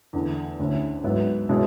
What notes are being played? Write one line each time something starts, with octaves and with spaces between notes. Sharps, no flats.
E2 D3 A3
D2 D3 A3 C#4 E4
G#2 F#3 B3 E4
B2 G#3 C#4 E4